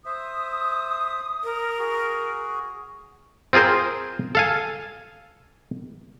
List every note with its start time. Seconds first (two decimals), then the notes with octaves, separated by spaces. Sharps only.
0.05 C5 E5 D#6
1.44 A#4
1.78 F#4 G#4
3.53 C4 F4 G#4 A#4 C5
4.35 A4 F5 G#5